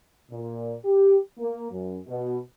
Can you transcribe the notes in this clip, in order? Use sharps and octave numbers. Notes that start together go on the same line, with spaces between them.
A#2
G4
A#3
F#2
B2